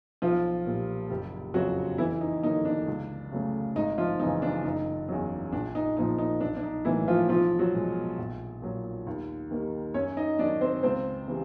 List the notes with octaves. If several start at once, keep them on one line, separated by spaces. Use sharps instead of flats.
B1 F3 F4
A#2 G3
F#1 G3 G4
F2 C#3 F3 F#3 F#4
F2 E3 E4
D#4
D3 F#3 A#3 D#4
D4
C#2
C#3 F#3 A3
G#1 D#4
F3 F4
F#2 C#3 E3 D#4
D4
F#1 D#4
E2 C#3 F#3
A#1 D4
D#4
A#2 F3 A#3 D#4
D#4
B1 D4
D4
D#4
A2 E3 F#3 A#3 E4
F3 F4
B1 F3 F4
F#3 F#4
B2 G#3
A#1
A#2 F#3
D#2
D#3 G3 A#3
F#2 C#4 C#5
D#4 D#5
D#3 F#3 D4 D5
C4 C5
C#2 C4 C5
C#3 E3 G3